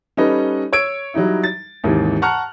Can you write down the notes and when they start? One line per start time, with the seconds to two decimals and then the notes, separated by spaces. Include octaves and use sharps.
0.17 G3 C#4 D#4 A4 B4 D#5
0.73 C#5 E6 G#6 D7
1.14 F#3 G3 D#4 E4
1.44 A6
1.84 D#2 G#2 C3 E3
2.22 F#5 A5 A#5 C#6 F6 F#6